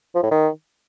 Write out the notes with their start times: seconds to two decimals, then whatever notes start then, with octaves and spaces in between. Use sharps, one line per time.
0.15 F3
0.23 A2
0.31 D#3